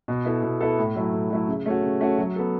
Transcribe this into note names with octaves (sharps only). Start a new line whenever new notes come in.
B2
B3 E4 A4
B2
B3 E4 A4
A2
F#3 A3 E4
A2
F#3 A3 E4
C#3
A3 C#4 F#4
C#3
A3 C#4 F#4
F#3
B3 A4